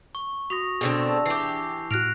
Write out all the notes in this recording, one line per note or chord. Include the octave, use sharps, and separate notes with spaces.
C#6
F#4 C#6 D#6 A#6 F7
B2 D3 C4 D4 G#4
A5 E6
E3 G4 C7
A2 F#4 F6 F#6 A#6 D7 F7